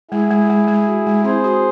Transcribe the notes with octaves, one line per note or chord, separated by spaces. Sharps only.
G#3 E4 G#4
G#3
G#3
G#3
F#4
G#3
C4 G#4 C5
F#4